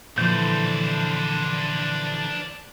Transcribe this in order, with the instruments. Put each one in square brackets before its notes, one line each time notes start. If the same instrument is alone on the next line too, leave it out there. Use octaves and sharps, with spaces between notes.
[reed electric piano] A#2 F3 [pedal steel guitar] D3 E3 G6 [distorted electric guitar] D4 C5